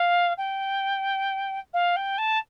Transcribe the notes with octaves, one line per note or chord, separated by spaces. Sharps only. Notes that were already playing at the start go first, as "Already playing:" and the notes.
Already playing: F5
G5
F5
G5
A5